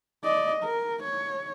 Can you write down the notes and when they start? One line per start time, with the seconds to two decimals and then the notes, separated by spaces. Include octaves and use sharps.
0.24 D5 D#5
0.63 A#4
1.03 C#5